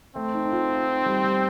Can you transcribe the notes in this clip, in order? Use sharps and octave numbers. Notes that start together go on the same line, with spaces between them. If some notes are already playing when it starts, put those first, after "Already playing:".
A3 C4
D#4
D#4
F4
D#4
G3
G3